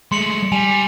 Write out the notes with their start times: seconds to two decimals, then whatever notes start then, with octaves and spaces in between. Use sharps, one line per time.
0.12 G#3 A3 C6 C#7 F#7
0.52 G3 G#5 F7